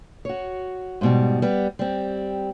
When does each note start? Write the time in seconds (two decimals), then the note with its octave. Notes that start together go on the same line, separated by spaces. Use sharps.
0.25 F#4 C#5
1.01 G#2 B2 G3
1.42 G3 B3
1.79 G3 C4